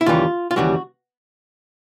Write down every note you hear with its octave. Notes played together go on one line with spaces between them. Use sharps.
E4
D#2 C#3 E3 G3 F4
F4
D#2 C#3 E3 G3 F#4